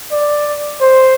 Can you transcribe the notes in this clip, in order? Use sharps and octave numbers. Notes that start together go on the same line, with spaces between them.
D5
C5